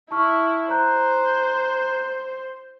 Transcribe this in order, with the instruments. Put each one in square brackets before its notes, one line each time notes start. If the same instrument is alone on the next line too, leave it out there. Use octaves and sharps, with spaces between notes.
[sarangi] E4 [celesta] A5 C#6 F6
[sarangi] C5 [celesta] A#5 F#6 G6